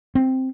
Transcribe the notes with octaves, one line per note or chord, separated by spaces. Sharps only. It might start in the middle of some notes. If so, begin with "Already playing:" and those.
C4